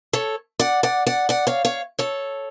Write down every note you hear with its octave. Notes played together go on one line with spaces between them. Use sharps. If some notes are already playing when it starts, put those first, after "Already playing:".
A4 C#5
D5 F#5
D5 F#5
D5 F#5
D5 F#5
C#5 F5
C#5 F5
A4 C#5